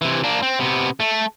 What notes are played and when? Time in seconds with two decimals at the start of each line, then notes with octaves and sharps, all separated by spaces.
0.02 C3 E3
0.24 A#3 D4
0.42 C4
0.59 C3 B3
1.00 A3